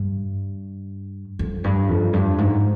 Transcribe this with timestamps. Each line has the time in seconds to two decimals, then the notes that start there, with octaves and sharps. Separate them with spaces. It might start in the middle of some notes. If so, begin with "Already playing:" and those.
Already playing: G2
1.39 F2
1.64 G2
1.89 F2
2.13 G2
2.38 G#2